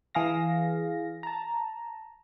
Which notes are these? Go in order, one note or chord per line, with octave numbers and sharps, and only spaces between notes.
E3 G#4 F5 A#6
A5 A#5